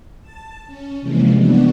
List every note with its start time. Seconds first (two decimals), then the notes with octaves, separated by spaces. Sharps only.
0.22 A5
0.67 C#4
1.01 C3 E3 F3 G3 G#3 A#3
1.37 C3 G3 B3 D4 F#4